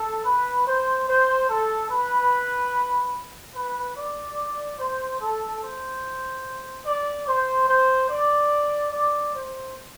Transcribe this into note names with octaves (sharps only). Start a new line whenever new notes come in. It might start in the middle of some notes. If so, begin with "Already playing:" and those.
Already playing: A4
B4
C5
C5
A4
B4
B4
D5
C5
A4
C5
D5
C5
C5
D5
D5
C5